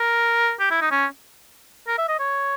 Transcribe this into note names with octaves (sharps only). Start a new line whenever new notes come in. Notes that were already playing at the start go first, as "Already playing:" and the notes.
Already playing: A#4
G4
E4
D#4
C#4
A#4
E5
D#5
C#5